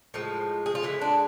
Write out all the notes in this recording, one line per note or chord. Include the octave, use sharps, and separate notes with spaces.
A2 F3 G#3
G#4
F4
D3 G#3 E4
D4